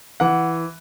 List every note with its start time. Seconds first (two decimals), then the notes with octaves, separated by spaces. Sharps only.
0.20 E3 F#5